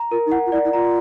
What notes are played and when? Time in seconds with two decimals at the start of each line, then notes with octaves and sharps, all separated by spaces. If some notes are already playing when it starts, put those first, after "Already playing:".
Already playing: A#5
0.11 F4 A#4
0.26 D#4
0.32 E4 F#5
0.46 F4
0.52 E4 D5
0.65 E4
0.73 F4 A#5